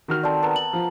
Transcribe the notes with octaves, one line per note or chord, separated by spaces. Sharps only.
D#3 F#4 F6
C4 A4 D5 A5
B3 A4 A#4
F#7
F3